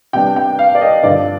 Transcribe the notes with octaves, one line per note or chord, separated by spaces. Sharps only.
C3 G3 B3 D4 G5
G5
F5
D5
D#5
G2 D3 F3 D5